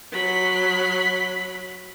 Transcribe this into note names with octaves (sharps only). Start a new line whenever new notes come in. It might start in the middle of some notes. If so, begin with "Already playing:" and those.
F#3 B5